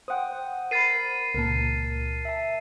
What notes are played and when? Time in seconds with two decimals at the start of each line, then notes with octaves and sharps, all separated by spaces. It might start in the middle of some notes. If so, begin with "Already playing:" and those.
0.08 C5 F#5 G5 D#6
0.71 A#4 B5 A6 C7 D#7
1.34 C#2 A#2 A#4 A5
2.25 E5 A5